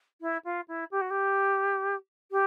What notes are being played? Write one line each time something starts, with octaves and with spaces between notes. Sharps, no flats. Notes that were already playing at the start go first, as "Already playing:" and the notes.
E4
F4
E4
G4
F#4
G4
G4